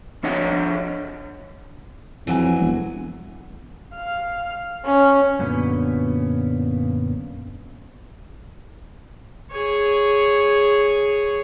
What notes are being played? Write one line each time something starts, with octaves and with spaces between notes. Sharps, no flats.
F3 D4 C#5 D#5 F#5
F2 E3 F#3 G#5
E1
F5
C#4
F#2 A#2 D3 B3 C#4
G#4 C#5